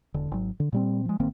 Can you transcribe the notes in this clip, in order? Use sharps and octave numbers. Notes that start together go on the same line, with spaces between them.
E1 D3
G#1 F#3
D3
A#2 G3 C4
F3 G#3
A1 D#3 A#3 C4